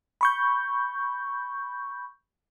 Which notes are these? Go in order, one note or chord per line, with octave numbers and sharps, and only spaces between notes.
B5 C#6 G6